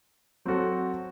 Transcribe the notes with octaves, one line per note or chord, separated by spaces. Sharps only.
F#3 C4 F#4 A4